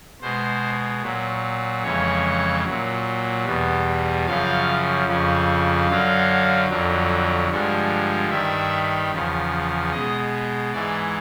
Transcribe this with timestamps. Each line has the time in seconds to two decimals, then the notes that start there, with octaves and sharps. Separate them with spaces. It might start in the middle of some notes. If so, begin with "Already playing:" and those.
0.21 B2 G#3 C5
1.02 A#2 F#3
1.83 F2 C#3 E3 G#3 C#5
2.65 A#2 F#3
3.45 E2 B2 G3
4.26 F#2 C#3 F3 F5
5.07 F2 C#3 F3
5.88 F#2 D3 F#3 F5
6.68 F2 D3 F#3
7.49 G2 D3 F3 G#3
8.30 G2 D#3 G3 E5
9.11 E2 C#3 F3
9.92 B2 G#3 D#5
10.73 G#2 E3 G#3 D5